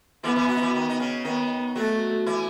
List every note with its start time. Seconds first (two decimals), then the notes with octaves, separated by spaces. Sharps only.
0.23 E3 B3 E4
0.36 E3 E4
0.48 F#3 F#4
0.56 D#4
0.61 E3 E4
0.74 D#3 D#4
0.90 D#4
1.00 C#3 C#4
1.25 D#3 B3 D#4
1.75 F#3 A3 F#4
2.26 E3 E4